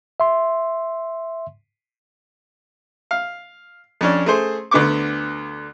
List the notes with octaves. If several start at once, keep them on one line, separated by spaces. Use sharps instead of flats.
E5 C6
F5
F2 C#4 D4
A3 G#4 C5
D2 D3 B3 C#6 D6